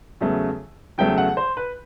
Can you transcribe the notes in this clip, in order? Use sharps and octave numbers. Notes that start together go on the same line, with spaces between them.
E2 C#3 F#3 A3
E2 C#3 F#3 A3 G5
F#5
C5
B4